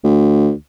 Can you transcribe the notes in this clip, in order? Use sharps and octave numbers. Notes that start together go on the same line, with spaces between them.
D2